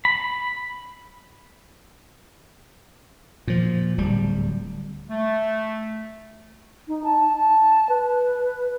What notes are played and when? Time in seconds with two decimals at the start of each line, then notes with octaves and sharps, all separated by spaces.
0.05 B5
3.47 A#2 F3
3.98 D1 G3
5.09 A3
6.88 D#4
7.04 A5
7.37 A5
7.89 B4